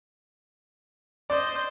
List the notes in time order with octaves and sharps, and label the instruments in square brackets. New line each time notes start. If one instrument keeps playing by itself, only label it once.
[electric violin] C5 D#5 [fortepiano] D5